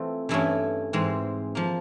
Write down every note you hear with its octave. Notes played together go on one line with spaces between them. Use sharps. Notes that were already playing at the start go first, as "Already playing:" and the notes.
Already playing: E3 A3 C4 F4
G2 E3 A3 C#4 E4
G#2 E3 G#3 C4
F3 A#3